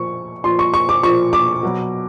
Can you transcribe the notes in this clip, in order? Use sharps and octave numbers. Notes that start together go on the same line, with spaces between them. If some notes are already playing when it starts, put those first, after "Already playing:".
Already playing: A#2 F3 C#6
A#2 F3 C6
C#6
C#6
D6
A#2 F3 C#6
D6
B2 F#3